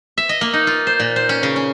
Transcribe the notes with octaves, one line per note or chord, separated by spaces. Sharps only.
E5
D#5
A#3
D#4
F4
C5
A#2
C5
C#4
C#3
C#4